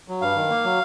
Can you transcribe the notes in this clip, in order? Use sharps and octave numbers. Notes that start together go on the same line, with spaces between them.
F#3
G2 F5
D#3
A#3
F#3